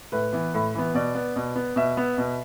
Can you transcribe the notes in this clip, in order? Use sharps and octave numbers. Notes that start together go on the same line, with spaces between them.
A2 B4
E3 B3
A2
E3 B3
B2 D5
B3
B2
B3
B2 E5
B3
B2